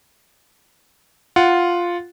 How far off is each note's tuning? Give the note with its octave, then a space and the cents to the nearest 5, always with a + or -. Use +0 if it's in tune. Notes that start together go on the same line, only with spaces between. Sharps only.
F4 +0 F#5 +0